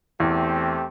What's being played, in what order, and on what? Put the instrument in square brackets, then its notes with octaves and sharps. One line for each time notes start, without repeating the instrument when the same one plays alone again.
[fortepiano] E2 [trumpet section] A3 C4 G4